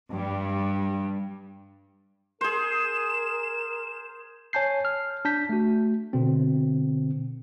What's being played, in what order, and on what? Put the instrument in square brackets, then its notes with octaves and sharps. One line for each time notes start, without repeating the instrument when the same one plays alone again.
[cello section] G2 G3
[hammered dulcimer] G#4 C5 [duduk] A#4 [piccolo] E7
[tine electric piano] C#5 G#5 A5 G6 C7
F6
D4 A5 G6 B6
A3 F#4
B2 D3 C4